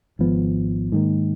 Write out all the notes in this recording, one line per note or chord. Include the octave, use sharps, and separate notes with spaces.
G#1 G#2 F3 B3
G#2 D#3 A#3